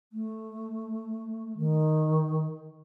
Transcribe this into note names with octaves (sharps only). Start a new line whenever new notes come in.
A3
D#3